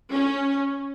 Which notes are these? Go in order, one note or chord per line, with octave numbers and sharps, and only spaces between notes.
C#4